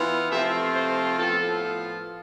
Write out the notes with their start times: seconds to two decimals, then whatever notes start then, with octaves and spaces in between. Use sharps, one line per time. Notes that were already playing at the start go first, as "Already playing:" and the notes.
Already playing: E3 B3 F4
0.31 C3 F3 A3 C4 F4 E5
0.74 C5
1.18 A2 F3 B3 F4 A4